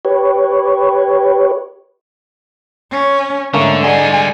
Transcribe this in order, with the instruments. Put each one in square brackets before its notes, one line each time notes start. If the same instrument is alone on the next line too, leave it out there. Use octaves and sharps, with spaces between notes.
[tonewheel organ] G4 B4 C#5
[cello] C#4
[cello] G#2 [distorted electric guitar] D3 [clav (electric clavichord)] A3 A#3 C#4
[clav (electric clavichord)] D3 G#3 [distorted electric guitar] G3 C6 [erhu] G#5